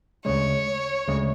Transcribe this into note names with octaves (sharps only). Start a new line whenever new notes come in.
D2 C#3 G#3 C#5
D2 C#3 G#3